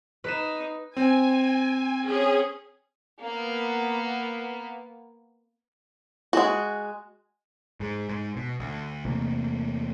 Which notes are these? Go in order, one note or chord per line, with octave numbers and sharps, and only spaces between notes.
D#4 B4 E7
C4 G#5
C#4 G#4
A#3 B3
G#3 F#4
G#2
G#2
B2
D2
E2 C3 A3 A#3